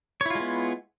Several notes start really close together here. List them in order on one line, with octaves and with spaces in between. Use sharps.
C#5 E4 F4 G#3 B3